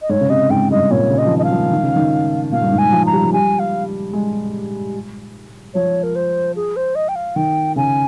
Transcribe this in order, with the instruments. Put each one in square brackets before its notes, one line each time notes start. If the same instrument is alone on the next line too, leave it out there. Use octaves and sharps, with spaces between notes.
[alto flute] D#5
[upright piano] G#2 [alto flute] C#5
[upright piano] C#3
[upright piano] C3 [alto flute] D#5
[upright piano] G#2 [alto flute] G5
[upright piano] G2 [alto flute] D#5
[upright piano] A#2 [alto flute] C#5
[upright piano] C#3
[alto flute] D#5
[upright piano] F3
D#3
[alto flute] D#5
F5
[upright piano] F3
D#3
C#3
D#3
[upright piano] A#2 [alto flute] F5
[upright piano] G2
G#2
[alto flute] G#5
[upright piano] F3
[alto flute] A#5
[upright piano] G3
F3
[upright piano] G3 [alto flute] G#5
[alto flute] F5
[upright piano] G#3
[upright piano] F3 [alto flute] C#5
[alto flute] A#4
C5
G#4
C5
D#5
G5
F5
[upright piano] D#3 [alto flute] G5
[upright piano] C#3 [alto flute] G#5